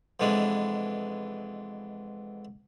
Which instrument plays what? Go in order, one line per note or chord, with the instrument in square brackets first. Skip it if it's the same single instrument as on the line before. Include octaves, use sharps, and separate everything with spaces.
[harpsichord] F2 B2 E3 G#3 D4